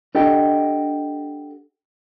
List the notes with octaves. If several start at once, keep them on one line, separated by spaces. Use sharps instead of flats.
D4 G4 A4 D#5 F#5 G5